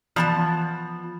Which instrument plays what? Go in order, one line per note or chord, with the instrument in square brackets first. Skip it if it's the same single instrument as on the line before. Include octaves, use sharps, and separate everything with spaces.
[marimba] E3 [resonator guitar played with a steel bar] F3 B3 A5